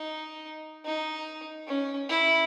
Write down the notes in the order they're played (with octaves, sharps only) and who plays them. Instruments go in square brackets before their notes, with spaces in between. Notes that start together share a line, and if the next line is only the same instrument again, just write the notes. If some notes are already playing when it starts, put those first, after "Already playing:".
Already playing: [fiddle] D#4
D#4
C#4
E4